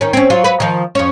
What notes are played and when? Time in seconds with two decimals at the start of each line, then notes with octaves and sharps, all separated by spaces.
0.01 D#3 C#4
0.13 C4 C#4
0.30 F#3 F4
0.44 F#3 B4
0.60 D#3 F3
0.95 F2 C#4